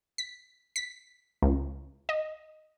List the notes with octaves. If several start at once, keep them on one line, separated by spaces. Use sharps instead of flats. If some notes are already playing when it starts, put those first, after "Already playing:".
B6
B6
C#2
D#5